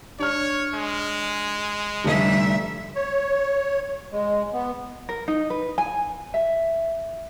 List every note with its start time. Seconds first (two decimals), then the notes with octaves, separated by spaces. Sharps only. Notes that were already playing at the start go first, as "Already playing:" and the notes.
0.19 D4 C#5 F6
0.74 G#3
2.04 F1 D3 G3 A3 E5
2.95 C#5
4.12 G#3
4.53 B3
5.09 A#4
5.28 D#4
5.50 B4
5.78 G#5
6.34 E5